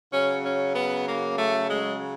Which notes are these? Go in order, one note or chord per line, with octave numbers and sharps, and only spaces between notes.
C#3 F#3 C#4
C#4
B3
A#3
A3
G#3